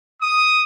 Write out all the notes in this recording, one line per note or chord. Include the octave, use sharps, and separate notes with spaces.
D#6